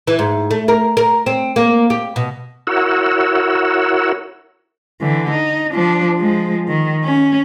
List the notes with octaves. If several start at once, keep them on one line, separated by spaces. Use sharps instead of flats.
E3
G#2
A3
A#4
A#4
C4
A#3
G4
B2
E4 F#4 A#4 C#5 F#5 E6
D3 E3
D#4
F3 D4
F3 G#3
D#3
C#4